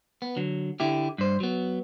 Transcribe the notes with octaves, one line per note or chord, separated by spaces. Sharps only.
B3
D3 F#3
D3 E4 G4
G2 C5
F#3 B3